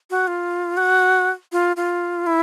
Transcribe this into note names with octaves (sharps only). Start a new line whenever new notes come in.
F#4
F4
F#4
F4
F4
E4